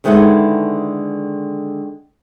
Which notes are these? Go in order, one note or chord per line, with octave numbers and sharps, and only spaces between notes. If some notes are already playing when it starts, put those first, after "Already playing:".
D3 D#3 G#3 B3 E4 A4